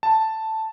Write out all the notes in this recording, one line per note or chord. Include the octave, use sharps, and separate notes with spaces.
A5